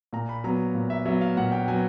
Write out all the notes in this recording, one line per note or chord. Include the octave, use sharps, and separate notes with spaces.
A#2 A#5
B5
F#3 B3 A#5
A#2
E5
F#3 B3 E5
F5
A#2 F#5
G5
F#3 B3 G#5